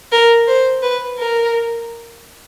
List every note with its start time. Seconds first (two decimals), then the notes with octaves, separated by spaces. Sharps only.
0.12 A#4
0.48 C5
0.83 B4
1.18 A#4